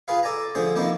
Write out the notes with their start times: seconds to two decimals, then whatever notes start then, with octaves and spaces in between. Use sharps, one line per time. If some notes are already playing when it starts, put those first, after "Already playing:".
0.08 F4 G#4 B4 F5
0.23 A4 D5 G#5 A#5
0.55 D3 F3 A3 G#4 C5
0.76 D#3 F3 A3 A#3 C4 E4